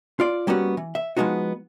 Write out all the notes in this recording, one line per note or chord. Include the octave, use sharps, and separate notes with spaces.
F4 D5
G3 A#3 B3 C#4 F#4
E3
E5
F3 G#3 A#3 B3 D#4 F#4